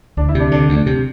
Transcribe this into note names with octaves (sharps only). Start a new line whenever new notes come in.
D2 D4
E4
C3
D4
D3 D4
D2
C3